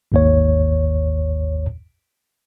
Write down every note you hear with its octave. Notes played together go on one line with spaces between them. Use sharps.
G#1 D#2 C#5